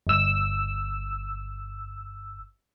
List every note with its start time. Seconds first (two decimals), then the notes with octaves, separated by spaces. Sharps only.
0.07 G1 E6